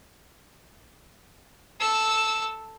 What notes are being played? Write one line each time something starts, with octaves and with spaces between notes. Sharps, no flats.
A4 E6